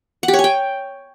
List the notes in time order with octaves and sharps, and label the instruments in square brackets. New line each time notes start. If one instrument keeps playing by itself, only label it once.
[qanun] F#5
G4
C#5
G#5
G5